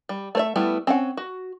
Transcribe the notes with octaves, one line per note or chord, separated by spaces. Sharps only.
G3
A3 C5 E5
G3 A3 B3 E4
C4 C#4 F#5
F#4